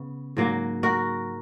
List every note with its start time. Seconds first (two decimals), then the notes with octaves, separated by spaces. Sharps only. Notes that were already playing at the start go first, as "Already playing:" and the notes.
Already playing: C#3 B3
0.37 G#2 F#3 A#3
0.83 F#4 A#4